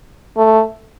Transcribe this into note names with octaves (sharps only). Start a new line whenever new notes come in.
A3